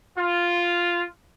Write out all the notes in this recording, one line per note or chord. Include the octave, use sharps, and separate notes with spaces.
F4